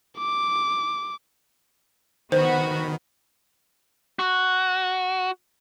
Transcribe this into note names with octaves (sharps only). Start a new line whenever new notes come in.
D6
D#3 B3 F#4 C5 B5
F#4